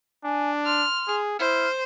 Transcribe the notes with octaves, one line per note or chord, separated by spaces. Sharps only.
D4 G#5
C6 F6
G#4
E4 C5 F6